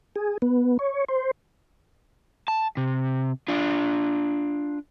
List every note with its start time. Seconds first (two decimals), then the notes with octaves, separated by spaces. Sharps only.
0.16 G#4
0.42 B3
0.79 C#5
1.09 C5
2.48 A5
2.77 C3
3.48 D4 F4